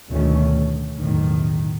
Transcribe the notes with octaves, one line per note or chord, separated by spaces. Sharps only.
D2 B2 D#3 A3 C#4
A2
B1 E2 A2 D#3